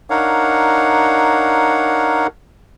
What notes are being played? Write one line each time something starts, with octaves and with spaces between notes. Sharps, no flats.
D4 D#4 A#4 C#5 F5 F#5